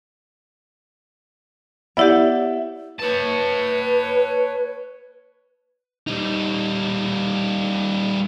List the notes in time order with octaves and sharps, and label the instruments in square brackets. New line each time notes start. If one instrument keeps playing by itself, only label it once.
[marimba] B3 E4 G4 [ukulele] C#5 D5 F#5 [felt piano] E5
[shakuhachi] B4 [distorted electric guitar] C#5 A5
[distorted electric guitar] G3 D#4